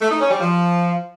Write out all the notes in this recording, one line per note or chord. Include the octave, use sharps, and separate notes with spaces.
A3
D#4
C#4
G3
F3